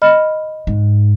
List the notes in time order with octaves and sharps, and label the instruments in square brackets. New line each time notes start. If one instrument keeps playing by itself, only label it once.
[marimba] D#5 B5 F6
[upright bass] G#2